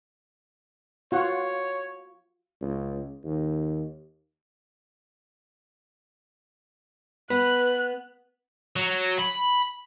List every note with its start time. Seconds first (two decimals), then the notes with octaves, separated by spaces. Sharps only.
1.12 F4 F#4 C#5 F#5
2.61 C#2
3.24 D#2
7.30 B3 B4 F#6
8.76 F#3
9.19 B5